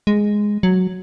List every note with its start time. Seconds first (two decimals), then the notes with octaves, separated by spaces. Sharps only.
0.07 G#3
0.63 F#3